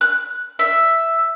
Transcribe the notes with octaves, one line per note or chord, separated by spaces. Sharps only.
F#6
E5